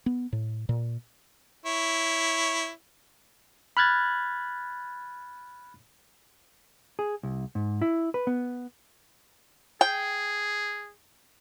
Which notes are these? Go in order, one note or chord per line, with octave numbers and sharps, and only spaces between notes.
B3
A2
A#2
E4 C#5
B5 F6 F#6 G#6 A6
G#4
C2
G#2
E4
B4
B3
G#4 G5